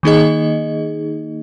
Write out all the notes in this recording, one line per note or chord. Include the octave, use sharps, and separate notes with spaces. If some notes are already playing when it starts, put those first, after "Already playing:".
D#3 A#3 D#4 G#4 D#5